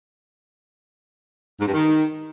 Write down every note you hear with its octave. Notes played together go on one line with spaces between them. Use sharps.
G#2
G2
D#3